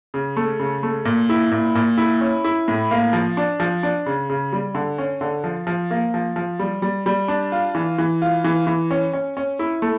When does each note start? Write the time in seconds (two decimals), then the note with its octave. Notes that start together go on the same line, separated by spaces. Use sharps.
0.14 C#3
0.37 A3
0.60 C#3
0.83 A3
1.05 A#2
1.30 E4
1.52 A#2
1.75 A#2
1.98 E4
2.21 C#4
2.44 E4
2.68 A2
2.91 A#3
3.13 F3
3.37 D4
3.60 F3
3.83 D4
4.06 C#3
4.30 C#3
4.53 G3
4.75 D3
4.98 C#4
5.21 D3
5.44 F3
5.67 F3
5.91 A#3
6.14 F3
6.36 F3
6.59 G3
6.82 G3
7.06 G3
7.28 D4
7.52 F4
7.75 E3
7.98 E3
8.22 F4
8.44 E3
8.67 E3
8.91 C#4
9.13 C#4
9.37 C#4
9.59 E4
9.82 A3